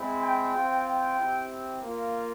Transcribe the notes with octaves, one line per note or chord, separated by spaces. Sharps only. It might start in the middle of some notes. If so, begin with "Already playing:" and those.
Already playing: G#3 C4 E4
G5
C4 F4
G5
C4 E4 G4
A#3 F4